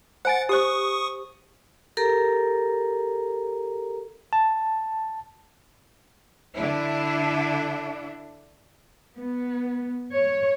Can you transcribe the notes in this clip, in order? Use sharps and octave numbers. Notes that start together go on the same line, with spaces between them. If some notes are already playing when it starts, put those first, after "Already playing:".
C5 F#5 G#5 A6
G4 C5 C#6 D#6
G4 A4 A#4 A#5
A5
D3 D4 E4
B3
C#5